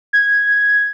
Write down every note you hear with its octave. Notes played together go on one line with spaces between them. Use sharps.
G#6